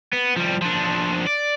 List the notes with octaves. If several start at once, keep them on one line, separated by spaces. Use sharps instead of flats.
B3
F3 G3
F3 D4
D5